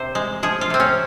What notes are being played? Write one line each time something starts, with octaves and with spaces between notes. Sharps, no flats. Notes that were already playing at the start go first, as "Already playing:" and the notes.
Already playing: C3 C5
G#3
F3 G#4
F4
C3 C4
C#4